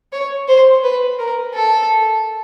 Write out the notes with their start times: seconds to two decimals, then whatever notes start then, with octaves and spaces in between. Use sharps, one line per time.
0.13 C#5
0.48 C5
0.83 B4
1.19 A#4
1.54 A4